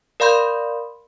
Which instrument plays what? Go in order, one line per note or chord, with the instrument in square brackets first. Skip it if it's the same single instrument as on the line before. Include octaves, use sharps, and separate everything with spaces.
[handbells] A#4 D5 F5 B5 C6 G6